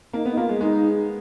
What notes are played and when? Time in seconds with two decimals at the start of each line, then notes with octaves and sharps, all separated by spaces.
0.13 A#3 D#4
0.25 B3
0.31 D#4
0.37 A#3 F4
0.49 G#3
0.61 G#3 D#4